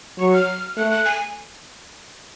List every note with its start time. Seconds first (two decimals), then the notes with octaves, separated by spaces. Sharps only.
0.19 F#3 C#6
0.34 F6
0.77 A3 F#6
0.91 F#6
1.05 G#5